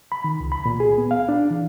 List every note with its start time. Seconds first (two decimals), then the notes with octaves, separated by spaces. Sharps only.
0.12 B5
0.24 D#3
0.40 C#2
0.52 B5
0.66 A#2
0.80 G#4
0.98 B3
1.11 F5
1.29 D4
1.50 E3